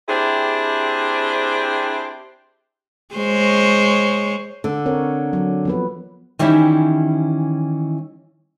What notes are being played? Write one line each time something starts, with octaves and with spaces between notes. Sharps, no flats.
C4 D4 E4 G4 G#4 C5
G#3 C5 C#5
D3
C4 A#4 C#5
F#3
F3 B3 B4
D#3 E3 G3 C#4 E4 G4